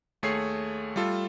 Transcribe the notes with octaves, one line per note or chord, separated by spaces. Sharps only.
D#2 A3 G#4 C#5 C7
G3 A3 F4 A4